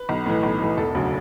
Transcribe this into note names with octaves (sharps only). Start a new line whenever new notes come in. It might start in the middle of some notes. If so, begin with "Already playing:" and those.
Already playing: B4
B1
A2 E3
B1
A2 E3
E1 A4
D2 C#3 F#3